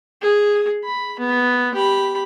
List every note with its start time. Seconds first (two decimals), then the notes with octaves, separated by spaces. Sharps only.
0.22 G#4
0.85 B5
1.20 B3
1.75 G4 B5